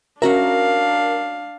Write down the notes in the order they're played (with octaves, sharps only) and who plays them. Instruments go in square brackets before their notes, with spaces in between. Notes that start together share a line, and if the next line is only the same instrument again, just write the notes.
[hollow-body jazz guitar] C#4 F#4 E5 [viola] D4 F5 [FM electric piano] A#4